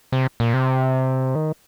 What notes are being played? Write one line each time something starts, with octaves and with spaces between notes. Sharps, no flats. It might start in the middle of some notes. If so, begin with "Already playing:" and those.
C3
A#2
C3
D#3